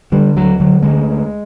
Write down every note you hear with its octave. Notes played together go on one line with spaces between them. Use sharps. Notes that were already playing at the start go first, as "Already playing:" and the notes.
D3 G3
D2 F#3
D3 F#3
D2 G#3